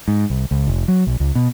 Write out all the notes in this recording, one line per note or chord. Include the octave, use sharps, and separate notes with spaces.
G#2
C2
C#2
F1
F#3
B1
C#2
B2